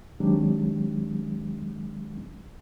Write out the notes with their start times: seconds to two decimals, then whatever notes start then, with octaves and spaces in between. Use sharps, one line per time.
0.20 D#3 F#3 G#3 C4 D4 G4